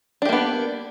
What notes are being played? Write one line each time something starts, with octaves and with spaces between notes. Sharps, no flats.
A#3 B3 D4 G4